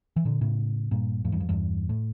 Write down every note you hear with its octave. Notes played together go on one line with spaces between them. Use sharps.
E3
A#2 D3
A2 C#3
G2 A#2
F2 A2
E2 G2
F2
E2 G2
A2